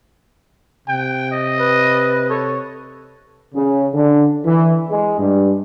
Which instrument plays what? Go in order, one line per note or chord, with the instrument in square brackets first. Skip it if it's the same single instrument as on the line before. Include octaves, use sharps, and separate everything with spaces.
[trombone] C3 [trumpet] G5
[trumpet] D#5
[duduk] B4
[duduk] A4 [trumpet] C#5
[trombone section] C#3
D3
E3
G#3
G2